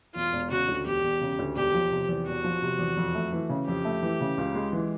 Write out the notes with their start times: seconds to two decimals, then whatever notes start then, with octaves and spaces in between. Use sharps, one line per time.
0.15 E1 F4
0.33 E1
0.50 C#3 F#4
0.68 D2
0.85 E1 G4
1.03 E1
1.21 C#3
1.39 D2
1.56 E1 G4
1.74 F3
1.91 C3
2.09 E2
2.27 E1 F#4
2.44 F3
2.62 C3
2.79 E2
2.97 F2
3.15 A3
3.33 E3
3.49 C#3
3.67 F2 G4
3.85 A3
4.03 E3
4.20 C#3
4.38 C#2
4.55 G#3
4.73 E3